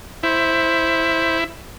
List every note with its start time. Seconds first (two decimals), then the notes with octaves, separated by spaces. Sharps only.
0.23 E4 C5